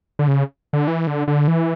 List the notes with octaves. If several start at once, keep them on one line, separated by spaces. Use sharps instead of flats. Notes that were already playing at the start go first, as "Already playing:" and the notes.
D3
C#3
D3
E3
D3
D3
E3